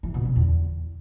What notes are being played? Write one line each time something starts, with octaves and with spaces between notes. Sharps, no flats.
E3
B2
D3
E2